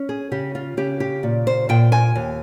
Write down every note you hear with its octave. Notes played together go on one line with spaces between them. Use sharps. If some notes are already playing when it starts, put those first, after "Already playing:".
Already playing: C#4
G#4
C#3 G4
F4
C#3 G4
G4
A#2
C5
A#2 G5
G#5
D#2